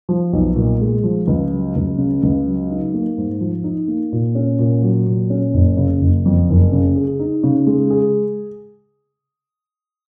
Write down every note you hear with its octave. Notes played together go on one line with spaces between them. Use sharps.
F3
B1
A#2
G#3
F3
C#2
F#3
C#2
C#3
C#2
F#3
D#4
A#3
G#2
F3
D#4
A#3
A#2
C#4
A#2
F#3
A#2
C#4
F#1
C#3
F#1
F2
F#1
C#3
G#4
D#4
C#3
G#3
G#4